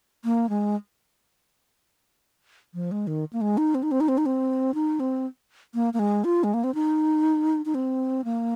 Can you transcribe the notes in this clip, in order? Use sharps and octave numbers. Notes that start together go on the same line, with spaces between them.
A#3
G#3
F3
G#3
D#3
A#3
G#3
D#4
C4
D#4
C4
D#4
C4
D#4
C4
D#4
C4
A#3
A#3
G#3
F4
G#3
A#3
C4
D#4
D#4
C4
A#3